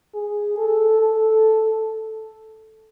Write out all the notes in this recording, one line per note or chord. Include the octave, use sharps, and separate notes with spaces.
G#4
A4
A4